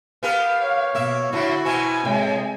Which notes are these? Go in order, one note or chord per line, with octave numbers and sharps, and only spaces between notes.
B3 G4 A#4 F5
C#5
B2 A#3 E5
A2 D3 F3 E4 F#4
B2 E3 C4 G#5
A2 C3 G#3